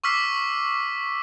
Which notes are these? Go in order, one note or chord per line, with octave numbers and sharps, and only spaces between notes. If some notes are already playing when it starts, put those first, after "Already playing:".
C#6 D6 E6 F6 B6 C7